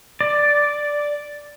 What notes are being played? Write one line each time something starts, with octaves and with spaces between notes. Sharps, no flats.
D5